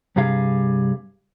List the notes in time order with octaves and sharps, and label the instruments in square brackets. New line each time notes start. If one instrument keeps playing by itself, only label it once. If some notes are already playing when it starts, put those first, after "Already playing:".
[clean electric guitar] G2 C3 G3 G#4 F5